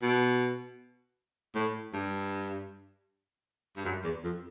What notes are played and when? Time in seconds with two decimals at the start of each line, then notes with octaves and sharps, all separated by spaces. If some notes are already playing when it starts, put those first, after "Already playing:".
0.02 B2
1.55 A2
1.93 G2
3.76 G2
3.85 F#2
4.03 E2
4.24 F2